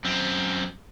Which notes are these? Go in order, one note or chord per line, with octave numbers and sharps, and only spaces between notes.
F#2 C4